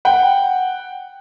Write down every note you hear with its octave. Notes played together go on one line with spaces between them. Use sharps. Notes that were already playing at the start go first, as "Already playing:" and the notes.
F#5 G5